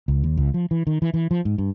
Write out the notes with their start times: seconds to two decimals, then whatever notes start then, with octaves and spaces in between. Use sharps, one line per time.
0.08 C#2
0.24 D#2
0.37 C#2
0.54 F3
0.71 E3
0.87 D#3
1.02 E3
1.14 E3
1.31 F3
1.45 G#2
1.58 G2